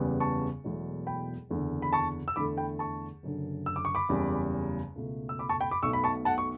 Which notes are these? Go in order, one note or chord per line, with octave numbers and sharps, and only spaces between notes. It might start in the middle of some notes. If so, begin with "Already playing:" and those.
Already playing: F#1 E2 C#3 G3 B3
A5 C#6
E1 E2 B2 F#3 A3
G5 B5
F#1 E2 D3
B5
A5 C#6
E6
E2 D3 A3 B5 D6
G5 B5
A5 C#6
F#1 F#2 D3
E6
D6
C#6
B5 D6
F#1 E2 C#3 G3
C#2 B2 A3
E6
B5 D6
A5 C#6
G5 B5
B5 D6
B1 B2 A3 C#6 E6
B5
A5 C#6
F#5 A5
C#6